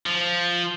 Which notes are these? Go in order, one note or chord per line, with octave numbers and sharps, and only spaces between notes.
F3